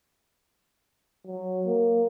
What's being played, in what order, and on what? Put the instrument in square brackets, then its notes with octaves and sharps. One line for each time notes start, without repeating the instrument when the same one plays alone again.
[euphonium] F#3
A#3